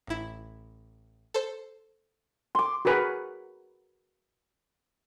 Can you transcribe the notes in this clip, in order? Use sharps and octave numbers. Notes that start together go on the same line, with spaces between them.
A1 E4
A4 C5
C6 D6
F#4 G#4 A#4 B4 G#5